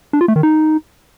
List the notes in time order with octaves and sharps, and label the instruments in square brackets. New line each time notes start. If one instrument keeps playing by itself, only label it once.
[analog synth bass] D4
F4
A3
D#3
D#4